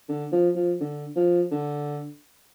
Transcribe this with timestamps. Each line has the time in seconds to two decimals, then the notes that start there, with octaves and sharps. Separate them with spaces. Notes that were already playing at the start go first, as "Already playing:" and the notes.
0.09 D3
0.32 F3
0.56 F3
0.80 D3
1.16 F3
1.51 D3